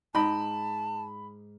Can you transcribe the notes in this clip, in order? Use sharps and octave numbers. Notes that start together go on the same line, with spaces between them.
G#2 D#5 G5 A5 B5